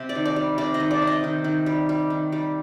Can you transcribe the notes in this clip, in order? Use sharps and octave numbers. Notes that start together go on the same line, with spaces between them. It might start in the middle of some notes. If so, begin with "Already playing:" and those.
Already playing: C3
D5
D#3
D5
G3
C3 D5
D#5
D#3
D5
C3
D#5
D#3
D#3
G3
G3
D#3
G3